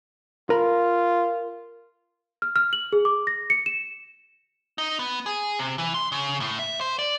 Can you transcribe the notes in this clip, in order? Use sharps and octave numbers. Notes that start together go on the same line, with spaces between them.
F4 A#4 B5
F6
F6
F#7
G#4
D6
A#6
C#7
E7
D#4
B3
G#4
C3
E3
C6
C#3
A2
E5
C5
D5